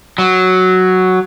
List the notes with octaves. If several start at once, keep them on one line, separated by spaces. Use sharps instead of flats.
F#3